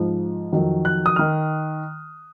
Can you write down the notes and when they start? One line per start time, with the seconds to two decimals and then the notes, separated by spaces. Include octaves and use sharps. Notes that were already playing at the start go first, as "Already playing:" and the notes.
Already playing: G#2 F3
0.53 F2 D#3 F#3
0.85 F#6
1.06 D#6
1.16 D#3 F6